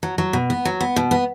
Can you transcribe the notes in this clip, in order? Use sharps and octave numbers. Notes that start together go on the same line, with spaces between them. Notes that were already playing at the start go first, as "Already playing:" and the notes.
F#3
F#3
B2
B3
F#3
B3
B2
B3